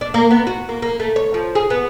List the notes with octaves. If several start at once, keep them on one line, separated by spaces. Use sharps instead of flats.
D4
A#3
B3
F#4
A#3
A#3
A3
C#5
F3
G#4
B3